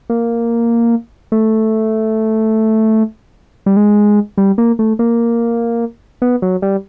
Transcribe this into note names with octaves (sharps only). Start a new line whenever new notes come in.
A#3
A3
G3
G#3
G3
A#3
A3
A#3
B3
F#3
G3